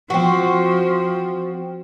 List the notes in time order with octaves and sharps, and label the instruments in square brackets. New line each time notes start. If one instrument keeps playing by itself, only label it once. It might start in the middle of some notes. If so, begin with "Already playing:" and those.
[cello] F3 [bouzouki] C4 F#4